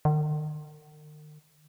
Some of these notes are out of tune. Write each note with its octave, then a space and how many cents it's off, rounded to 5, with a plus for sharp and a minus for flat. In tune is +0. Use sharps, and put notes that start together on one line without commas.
D#3 -45